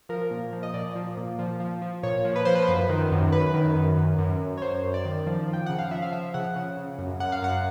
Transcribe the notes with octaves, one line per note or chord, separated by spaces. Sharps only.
F3 A#4
A#2
F3
D#5
A#2 D5
F3
A#2
F3
F3
F3
A#2 C#5
F3
B4
F3 C5
B4
C5
F#2 B4
D#3
F#2
F#2 B4
D#3
F#2
F#2
F#2
F#2
C#5
F#2 C5
F#2
D5
D#3
F3
F3
G5
C#3 F#5
F5
F3 E5
F5
F3 E5
C#3 F#5
C#3
C#3
F#2
F#2 F#5
F5
F#2 F#5